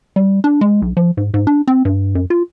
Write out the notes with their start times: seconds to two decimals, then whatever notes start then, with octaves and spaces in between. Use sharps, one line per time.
0.16 G3
0.44 D4
0.61 G#3
0.82 B1
0.97 F3
1.17 G#2
1.34 G#2
1.47 D4
1.67 C4
1.85 G2
2.15 F#2
2.30 F4